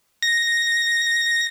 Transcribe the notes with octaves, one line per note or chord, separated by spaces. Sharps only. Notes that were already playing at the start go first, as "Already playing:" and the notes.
A#6